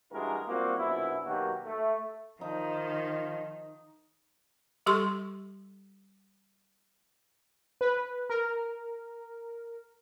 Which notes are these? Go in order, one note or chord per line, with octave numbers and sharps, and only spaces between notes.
A1 G2 G#3 E4 F#4 A#4
G3 A#3 C4 F4 F#4
A#1 F#2 B2 B3 E4
B2 D#3 F#3 A#3 F#4 G4
A3
D#3 F3 D#4
G3 G4 A4 C6 C#6
B4
A#4